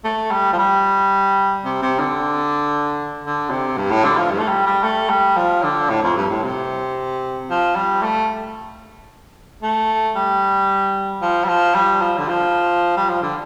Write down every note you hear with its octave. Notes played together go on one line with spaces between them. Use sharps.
A3
G3
F3
G3
C3
C3
D3
D3
C3
G2
A2
D3
F3
G2
A3
G3
G3
A3
G3
F3
D3
A2
F2
G2
A2
C3
F3
G3
A3
A3
G3
F3
G3
F3
G3
F3
D3
F3
G3
F3
D3